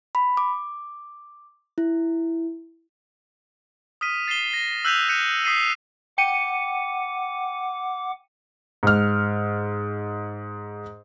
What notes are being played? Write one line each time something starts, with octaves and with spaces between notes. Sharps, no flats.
B5
D6
E4
D#6 F6 B6 D#7
A6 C7 D#7 E7 G7
A#6
E6 F#6 G6 B6 D#7 F7
F#6 G6 C#7 D#7 E7
D#6 B6 C7 D#7
F#5 G5 D6 C#7 D#7
G#2 F6